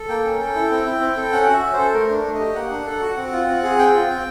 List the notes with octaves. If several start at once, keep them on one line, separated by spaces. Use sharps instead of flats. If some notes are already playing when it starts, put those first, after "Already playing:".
Already playing: A4
A#3 G5
C#4
A4
E4
C4
E4
C4
A4
C#4 F#5
F#4
E5
C#4
A4 C5
A3 A#4
D4
A3
D#5
G4
A#3 F#5
D4
A4
F#4
C4
F4
C4
G#4
C4 G5
F4
C4